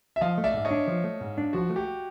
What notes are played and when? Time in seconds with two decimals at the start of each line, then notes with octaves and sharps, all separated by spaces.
0.16 E5
0.21 F3 D#5 F5
0.38 A3
0.44 D5 E5
0.54 G#2
0.65 C#5 D#5
0.71 D4
0.87 F3
1.04 A3
1.21 G#2
1.38 D4
1.53 F3 F#4
1.70 A3
1.76 G4